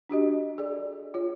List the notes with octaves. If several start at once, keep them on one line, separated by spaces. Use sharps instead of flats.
D4 F#4 G4 D#5
G#4 A4 D5
F4 C#5